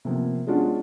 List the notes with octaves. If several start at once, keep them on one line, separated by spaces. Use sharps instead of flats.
C3 F3 A#3 B3
G#3 B3 C#4 D4 F4 F#4